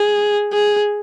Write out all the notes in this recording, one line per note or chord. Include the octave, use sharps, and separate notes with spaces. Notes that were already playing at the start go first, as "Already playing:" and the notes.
Already playing: G#4
G#4